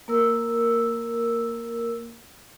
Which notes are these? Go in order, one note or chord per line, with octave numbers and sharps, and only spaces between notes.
A#3 A#4 E6